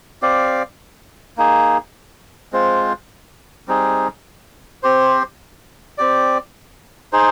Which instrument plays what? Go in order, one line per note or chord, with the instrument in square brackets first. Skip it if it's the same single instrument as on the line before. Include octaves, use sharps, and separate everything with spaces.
[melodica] C4 G4 D5 F5
A#3 D#4 G#4
G#3 C4 F4 C5
G3 C4 D#4 G#4
C4 G4 C5
C4 G4 D5
D#4 G#4 C5